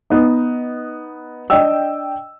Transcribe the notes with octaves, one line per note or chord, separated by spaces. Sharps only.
B3 D#4
D4 D#5 G5 E6